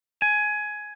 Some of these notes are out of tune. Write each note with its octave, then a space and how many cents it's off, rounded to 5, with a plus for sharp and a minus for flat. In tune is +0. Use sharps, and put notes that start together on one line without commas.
G#5 +15